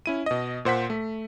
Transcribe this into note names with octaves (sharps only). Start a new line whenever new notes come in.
C#4 E4 D#7
B2 D#5
A#2 C5 F#5 B6
A3